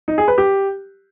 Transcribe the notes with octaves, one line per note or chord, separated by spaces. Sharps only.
D#4
G#4
B4
G4